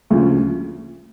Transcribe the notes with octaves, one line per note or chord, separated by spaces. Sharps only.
D2 C#3 F3